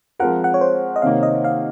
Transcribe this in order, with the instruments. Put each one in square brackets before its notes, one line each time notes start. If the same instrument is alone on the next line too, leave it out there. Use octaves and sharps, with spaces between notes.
[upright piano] F3 G#3 C4 F4 A#4 [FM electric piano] F#5
[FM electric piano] F#5
C#5
C5
D#5
[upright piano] C3 D#3 A#3 [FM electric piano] F5
[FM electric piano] D#5
F5